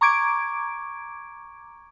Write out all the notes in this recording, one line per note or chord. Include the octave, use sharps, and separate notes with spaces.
A#5 C#6 D6 G#6 D7